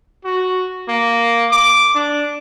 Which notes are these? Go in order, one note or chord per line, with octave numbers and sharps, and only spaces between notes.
F#4
A#3
D6
D4